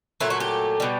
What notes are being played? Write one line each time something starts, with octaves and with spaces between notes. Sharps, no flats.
A#2 F#3 A3 E4
F#4
G4
B2 G3